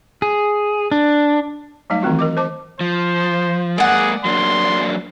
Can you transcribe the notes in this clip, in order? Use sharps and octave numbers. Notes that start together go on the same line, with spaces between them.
G#4
D4
F#3 G3 A3 D#4 F5
D#3 E3 A3 C4 F4 F#4
A#4 D#5 D6
C5 D#5 A5 D6
F3 C5
G#3 A#3 G#4 D5 F#5
F#3 A#3 D4 C6